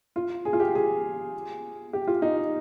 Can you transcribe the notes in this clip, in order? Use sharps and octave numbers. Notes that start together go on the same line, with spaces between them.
F4
G#4
F4
G4
G#4
G4
F4
D#4